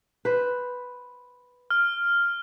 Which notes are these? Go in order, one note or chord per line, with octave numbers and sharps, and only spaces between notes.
B4 C5
F6